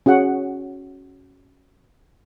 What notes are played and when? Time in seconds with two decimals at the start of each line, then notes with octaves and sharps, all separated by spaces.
0.06 C#4 F#4 G#4 F#5